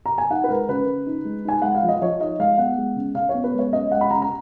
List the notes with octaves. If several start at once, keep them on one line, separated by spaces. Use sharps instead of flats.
A#5
G#5
D#4 F#5
B4
G#3 A#4
C#3 B4
C#3
D#4
G#3
D#4 G#5
G#3 F#5
F5
F3
D#5
F3 C#5
D#4 D#5
G#3 F5
B3 F#5
G#3
C#3
C#3 F5
B3 C#5
B4
G#3
C#5
C#4 D#5
G#3 F#5
B5
C#3 A#5
A#5